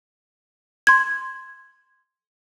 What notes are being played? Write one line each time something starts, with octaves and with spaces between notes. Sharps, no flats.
C6 G#6